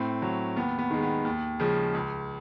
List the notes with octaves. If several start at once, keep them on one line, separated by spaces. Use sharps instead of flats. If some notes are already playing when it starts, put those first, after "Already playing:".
Already playing: A2 C4
F#3
D#2 B3
B3
D#3 G#3
B3
D#2
C#3 F3 G#3
C#2